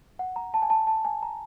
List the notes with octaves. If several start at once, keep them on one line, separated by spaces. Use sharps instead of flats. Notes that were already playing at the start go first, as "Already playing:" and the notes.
F#5
A#5
A5
G#5
A5
A5
G#5
A#5